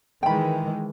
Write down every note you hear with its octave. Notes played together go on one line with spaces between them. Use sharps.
D#3 E3 G#3 G5 B5